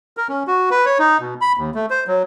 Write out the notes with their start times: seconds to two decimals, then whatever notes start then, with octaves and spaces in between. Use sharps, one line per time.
0.17 A#4
0.29 C#4
0.47 F#4
0.71 B4
0.85 C#5
0.99 D#4
1.20 B2
1.41 B5
1.57 D#2
1.75 A3
1.90 C5
2.07 F#3